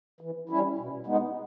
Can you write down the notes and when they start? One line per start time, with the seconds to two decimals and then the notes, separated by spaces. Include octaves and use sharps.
0.21 E3
0.49 G3 C#4 E4
0.78 B2
1.06 G#3 B3 D#4